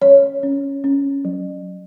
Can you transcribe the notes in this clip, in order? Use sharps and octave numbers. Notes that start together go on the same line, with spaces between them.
C#4 C#5
C#4
C#4
F#3